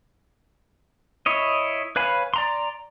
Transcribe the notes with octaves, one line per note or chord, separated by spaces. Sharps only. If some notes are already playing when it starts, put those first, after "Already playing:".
E4 C#5 D#5
B4 C#5 F5 G#5 B5
D5 A#5 C6